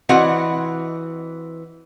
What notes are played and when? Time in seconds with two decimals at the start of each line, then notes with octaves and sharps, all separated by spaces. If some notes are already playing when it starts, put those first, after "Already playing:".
0.09 E3 C4 F#4 D#5 F#5